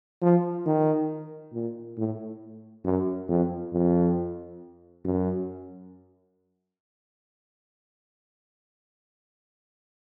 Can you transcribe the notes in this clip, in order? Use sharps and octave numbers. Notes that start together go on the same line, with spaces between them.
F3
D#3
A#2
A2
F#2
F2
F2
F#2